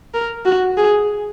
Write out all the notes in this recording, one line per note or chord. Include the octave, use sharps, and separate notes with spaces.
A#4
F#4
G#4